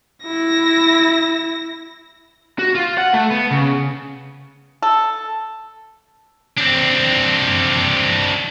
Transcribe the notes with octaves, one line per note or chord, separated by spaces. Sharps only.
E4 A#6
F#4
F4
F#5
A3
B3
C#3
A4
C4 D4